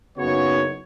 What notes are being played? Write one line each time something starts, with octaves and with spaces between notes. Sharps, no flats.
F#1 C#3 B3 D#4 F#4 C#5